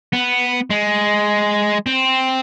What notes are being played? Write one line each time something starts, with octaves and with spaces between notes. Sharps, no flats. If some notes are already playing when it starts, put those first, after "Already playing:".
B3
G#3
C4